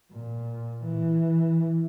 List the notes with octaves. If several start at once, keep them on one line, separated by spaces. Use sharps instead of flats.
A#2
E3